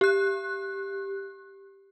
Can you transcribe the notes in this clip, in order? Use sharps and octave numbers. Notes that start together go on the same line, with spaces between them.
G4 F#6